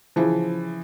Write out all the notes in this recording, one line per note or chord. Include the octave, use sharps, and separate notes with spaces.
C#3 E3 F3